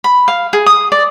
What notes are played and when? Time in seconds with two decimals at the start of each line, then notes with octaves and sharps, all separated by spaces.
0.04 B5
0.28 F5
0.53 G#4
0.66 D#6
0.92 D5